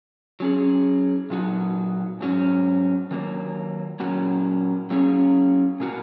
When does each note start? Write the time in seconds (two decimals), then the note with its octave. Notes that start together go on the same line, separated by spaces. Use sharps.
0.40 F#3 C#4 G#4
1.30 A#2 F#3 D#4 F#4
2.21 G#2 F#3 C#4
3.11 D#3 F#3 A#3
4.00 A#2 F#3 A#3 C#4 F#4
4.90 F#3 A#3 C#4 G#4
5.80 A#2 A#3 F#4